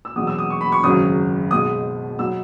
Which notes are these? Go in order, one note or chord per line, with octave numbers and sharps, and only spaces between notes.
E6
E2 B2 F#3 D#6
E6
D#6
C#6
B5
C#6
G#1 F#2 C#3 F#3 D#6
B1 B2 G#3 D#6
B2 F#3 E6